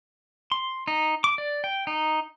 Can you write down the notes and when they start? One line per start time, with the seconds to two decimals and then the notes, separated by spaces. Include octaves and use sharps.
0.52 C6
0.88 D#4
1.24 D6
1.38 D5
1.64 G5
1.87 D#4